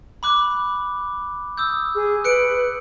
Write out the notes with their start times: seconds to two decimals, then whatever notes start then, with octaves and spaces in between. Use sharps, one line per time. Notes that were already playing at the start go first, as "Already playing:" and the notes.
0.23 B5 D6 F#6
1.57 D#6 E6 G6
1.95 G#4
2.24 B4 F#6 C#7 D7